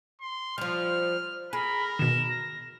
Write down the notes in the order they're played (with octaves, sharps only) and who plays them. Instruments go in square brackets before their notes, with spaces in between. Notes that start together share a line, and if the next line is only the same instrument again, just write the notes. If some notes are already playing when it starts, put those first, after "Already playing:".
[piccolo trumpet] C6
[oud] F3 G3 [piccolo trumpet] F6
[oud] G#4 [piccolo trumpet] A#4 [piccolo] B5
[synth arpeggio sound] B2 D#3 [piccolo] E7
[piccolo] A#6